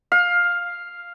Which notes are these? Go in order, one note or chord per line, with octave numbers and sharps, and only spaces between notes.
F5